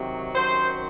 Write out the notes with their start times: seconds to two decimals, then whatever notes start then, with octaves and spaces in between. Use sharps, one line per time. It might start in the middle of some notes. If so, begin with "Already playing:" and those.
Already playing: C3 D#3 F#3
0.34 F#2 D#3 F#3 C5